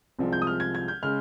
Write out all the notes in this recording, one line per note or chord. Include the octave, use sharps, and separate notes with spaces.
C2 C3 F3 G#3
G6
D#6
F6
G#6
G#6
G6
C#3 G#3 F6